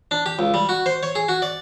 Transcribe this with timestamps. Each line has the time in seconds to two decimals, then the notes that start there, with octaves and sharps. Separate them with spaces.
0.11 D4
0.26 G4
0.39 C#2
0.54 G3
0.69 F#4
0.86 C5
1.03 C#5
1.15 G#4
1.28 F#4
1.42 D5